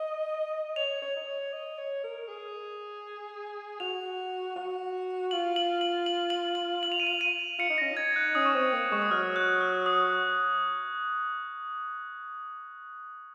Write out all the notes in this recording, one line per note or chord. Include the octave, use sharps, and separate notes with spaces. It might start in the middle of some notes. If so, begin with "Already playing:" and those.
Already playing: D#5
C#5 F7
C#5
D#5
C#5
D#5
C#5
A#4
G#4
F#4 F7
F#4
F4 F#7
F#7
F#7
F#7
F#7
F#7
F#7
F7
D#7
F7
D#7
F4 C#7
D#4
C#4 A#6
D#4 G#6
F#6
C#4 D#6
C#6
C4 D#6
A#3
G#3 C#6
D#6
F#3 F6
F#6
F6
D#6